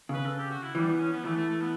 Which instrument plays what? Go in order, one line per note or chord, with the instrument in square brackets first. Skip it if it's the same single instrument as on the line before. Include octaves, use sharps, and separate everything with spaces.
[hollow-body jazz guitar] C#3 [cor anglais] B4
[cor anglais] A4
G4
F#4
E4
[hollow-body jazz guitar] E3 [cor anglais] G3
[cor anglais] B3
C#4
B3
[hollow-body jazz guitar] E3 [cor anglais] A3
[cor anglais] A3
A3
B3